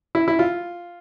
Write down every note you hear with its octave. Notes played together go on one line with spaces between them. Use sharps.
E4
E4
F4